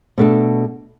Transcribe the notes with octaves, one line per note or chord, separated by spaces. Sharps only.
B2 A3 D4 A4